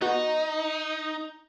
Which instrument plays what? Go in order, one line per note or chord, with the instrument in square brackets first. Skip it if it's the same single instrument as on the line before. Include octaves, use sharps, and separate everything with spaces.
[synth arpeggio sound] B3 F#4 [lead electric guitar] D#4